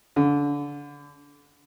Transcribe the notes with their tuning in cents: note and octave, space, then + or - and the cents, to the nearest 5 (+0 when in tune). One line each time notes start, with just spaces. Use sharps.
D3 -30